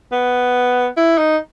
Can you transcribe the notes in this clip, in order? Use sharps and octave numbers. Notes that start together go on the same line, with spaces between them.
B3
E4
D#4